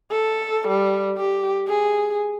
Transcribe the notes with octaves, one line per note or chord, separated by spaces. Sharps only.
A4
G3
G4
G#4